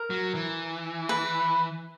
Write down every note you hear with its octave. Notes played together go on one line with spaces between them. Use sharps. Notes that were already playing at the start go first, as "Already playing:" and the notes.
Already playing: A#4
F#3
E3
B4